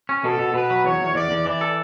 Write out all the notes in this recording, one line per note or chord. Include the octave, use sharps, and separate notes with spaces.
C#4
B2 A4
B2
B2 B4
F#3
E2 C#5
E2
E2 D5
E2
E3 D5
A4